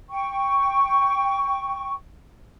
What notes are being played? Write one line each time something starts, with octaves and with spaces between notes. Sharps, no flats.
G5 C#6